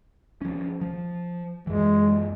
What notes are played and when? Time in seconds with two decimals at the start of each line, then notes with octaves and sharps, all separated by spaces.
0.42 F3 C#4
0.81 F3
1.67 F#2 E3 G#3